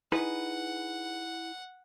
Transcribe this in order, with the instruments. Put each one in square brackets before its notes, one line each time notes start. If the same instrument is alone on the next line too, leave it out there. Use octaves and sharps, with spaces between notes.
[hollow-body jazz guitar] D#4 G#4 B4 [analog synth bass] E4 [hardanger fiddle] F#5